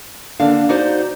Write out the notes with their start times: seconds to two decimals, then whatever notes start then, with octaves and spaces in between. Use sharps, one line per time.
0.40 D3 A#3 D4 F5
0.69 D#4 F#4 C5 D5